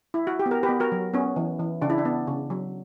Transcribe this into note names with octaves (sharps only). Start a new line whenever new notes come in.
E4
F#4
G4
B3
A#4
G4 B4
B3
F#4 A#4
F#3
B3 C#4
E3
E3
C#3 D4
E4
D4
B3
C#3
F#3